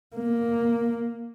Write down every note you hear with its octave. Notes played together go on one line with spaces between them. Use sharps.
A#3